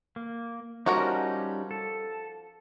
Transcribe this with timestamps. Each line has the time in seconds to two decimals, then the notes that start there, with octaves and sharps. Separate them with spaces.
0.16 A#3
0.86 F3 G3 C#4 D#4 F#4 A#4
1.71 A4